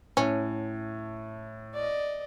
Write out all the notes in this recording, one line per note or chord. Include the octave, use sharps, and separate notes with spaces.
A2 C#4
D5 D#5